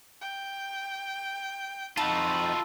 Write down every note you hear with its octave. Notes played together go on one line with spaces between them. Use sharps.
G5
F2 D#4 F4 F#4 A4 B5